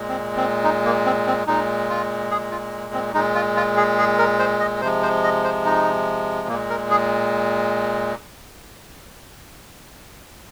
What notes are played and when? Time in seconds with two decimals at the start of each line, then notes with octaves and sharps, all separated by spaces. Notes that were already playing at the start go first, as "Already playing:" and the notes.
Already playing: A#2 G#3
0.09 C4
0.37 C4
0.64 D#4
0.85 A#3
1.05 C4
1.27 C4
1.47 A#2 G#3 D#4
1.90 F4
2.31 G#4
2.51 F4
2.94 C4
3.14 A#2 G#3 D#4
3.35 F4
3.57 F4
3.77 G#4
3.98 G#4
4.19 A#4
4.39 C5
4.60 D#5
4.81 C3 F3 G#3 C5
5.03 C5
5.23 D#5
5.44 C5
5.65 D#4
6.48 A#2 A#3
6.52 G#3
6.70 A#4
6.90 G#4